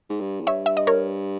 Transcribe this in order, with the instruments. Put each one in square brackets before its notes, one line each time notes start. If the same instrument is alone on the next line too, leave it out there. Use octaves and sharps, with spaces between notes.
[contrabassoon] G#2
G2
E2
[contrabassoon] G2 [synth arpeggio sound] C#5 E5
[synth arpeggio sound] E5
D#5
A#4 C#5